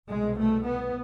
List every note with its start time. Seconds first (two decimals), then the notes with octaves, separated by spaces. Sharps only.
0.08 C2 B2 G#3
0.39 A3
0.67 B3